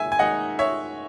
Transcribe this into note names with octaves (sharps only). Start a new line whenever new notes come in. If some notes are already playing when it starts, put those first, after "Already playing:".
Already playing: D#3 G#3 E5 G#5
G#5
D#3 G#3 D#4 D#5 F#5
C#5 E5